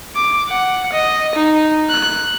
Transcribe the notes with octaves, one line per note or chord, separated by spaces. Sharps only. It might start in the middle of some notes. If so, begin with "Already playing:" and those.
D6
F#5
D#5
D#4
F#6